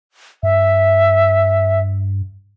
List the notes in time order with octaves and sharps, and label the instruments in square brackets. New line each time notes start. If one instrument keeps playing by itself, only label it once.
[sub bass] G2 [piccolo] E5